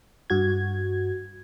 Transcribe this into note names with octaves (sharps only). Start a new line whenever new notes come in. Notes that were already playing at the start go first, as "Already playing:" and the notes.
G2 F#4 G#6